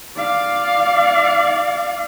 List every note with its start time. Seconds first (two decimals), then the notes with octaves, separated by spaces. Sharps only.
0.17 D5 F5